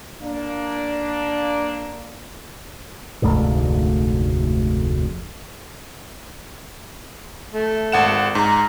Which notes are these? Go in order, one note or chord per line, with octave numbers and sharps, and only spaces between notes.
A#3 D4
F1 D2 G#2 D3
A3
G#1 F#5 E7
G#2 A#5